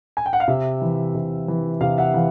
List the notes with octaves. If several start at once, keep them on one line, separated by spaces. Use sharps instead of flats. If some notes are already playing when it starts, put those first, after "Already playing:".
G#5
G5
F#5
F5
C3 E5
E3
C3
E3
C3 F5
E5 F#5
E3 F5